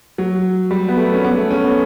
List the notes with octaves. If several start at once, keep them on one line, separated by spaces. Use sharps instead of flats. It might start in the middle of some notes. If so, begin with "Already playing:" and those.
F#3
G3
B3
A3
C#4
B3
A3
C#4
B3